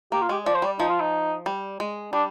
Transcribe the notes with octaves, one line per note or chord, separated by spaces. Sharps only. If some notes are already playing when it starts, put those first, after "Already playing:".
A#3 G4
F4
G#3 G4
F3 D5
C5
G3 D5
F3 D#4
F4
D#4
G3
G#3
G3 D4